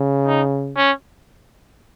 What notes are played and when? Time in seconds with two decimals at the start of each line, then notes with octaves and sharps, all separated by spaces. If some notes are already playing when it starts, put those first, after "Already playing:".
Already playing: C#3
0.27 D#4
0.77 C#4